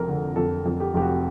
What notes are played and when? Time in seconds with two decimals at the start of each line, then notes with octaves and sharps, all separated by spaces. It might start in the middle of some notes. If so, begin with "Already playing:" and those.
Already playing: F1 F2 A4 A#4
0.08 D3
0.36 F2 A4
0.66 F2
0.80 G4
0.94 F1 G4
1.02 F#4